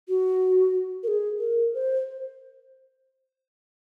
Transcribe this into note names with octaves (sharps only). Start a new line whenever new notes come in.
F#4
A#4
G#4
A#4
C5